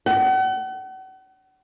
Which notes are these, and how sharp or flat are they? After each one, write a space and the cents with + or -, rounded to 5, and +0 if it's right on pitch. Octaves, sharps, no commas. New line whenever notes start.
F#5 +40